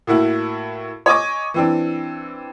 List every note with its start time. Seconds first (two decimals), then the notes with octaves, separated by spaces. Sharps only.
0.07 A2 A#3 E4 F#4
1.06 C#5 D#5 G#5 C#6 D6 A#6
1.54 E3 C4 D4